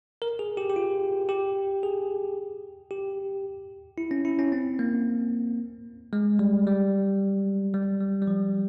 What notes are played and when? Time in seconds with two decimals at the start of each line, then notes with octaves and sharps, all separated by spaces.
0.22 A#4
0.39 G#4
0.57 G4
0.70 G4
0.76 F4
1.29 G4
1.83 G#4
2.91 G4
3.98 E4
4.11 C#4
4.25 E4
4.39 C#4
4.52 C4
4.79 A#3
6.13 G#3
6.39 G3
6.67 G3
7.74 G3
8.00 G3
8.22 G3
8.27 F3